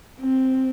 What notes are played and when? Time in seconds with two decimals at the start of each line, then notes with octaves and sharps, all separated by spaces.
0.20 C4